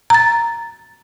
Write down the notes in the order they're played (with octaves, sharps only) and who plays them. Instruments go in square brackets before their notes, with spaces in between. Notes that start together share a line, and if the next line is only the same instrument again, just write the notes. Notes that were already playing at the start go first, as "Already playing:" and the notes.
[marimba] A#5 A6